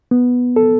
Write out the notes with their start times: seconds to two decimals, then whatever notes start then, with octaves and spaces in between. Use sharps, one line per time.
0.11 B3
0.56 A4